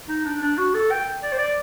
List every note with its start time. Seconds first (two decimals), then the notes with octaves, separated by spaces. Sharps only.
0.09 D#4
0.25 D4
0.42 D4
0.58 F#4
0.74 A4
0.91 G5
1.23 D5
1.32 C5
1.38 D5